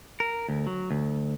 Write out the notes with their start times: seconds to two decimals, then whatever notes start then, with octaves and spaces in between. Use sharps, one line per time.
0.20 A#4
0.49 D2
0.67 F#3
0.91 D2